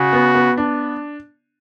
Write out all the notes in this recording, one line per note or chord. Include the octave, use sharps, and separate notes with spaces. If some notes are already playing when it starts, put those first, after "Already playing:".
Already playing: C#3 F#4
B3
B3
D4